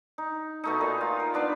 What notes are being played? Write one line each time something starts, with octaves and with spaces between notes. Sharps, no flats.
D#4
B2 A3 D#4
A#2
F4
A#4
B3 D4 B4